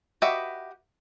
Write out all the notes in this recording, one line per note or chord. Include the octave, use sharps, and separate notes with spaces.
F#4 G4 B4 D#5 E5